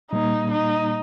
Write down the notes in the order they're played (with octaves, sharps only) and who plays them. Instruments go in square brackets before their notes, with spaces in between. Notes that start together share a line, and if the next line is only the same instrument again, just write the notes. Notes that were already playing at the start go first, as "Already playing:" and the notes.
[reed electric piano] A#2 G3 A#3 [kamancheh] D#4
[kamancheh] D#4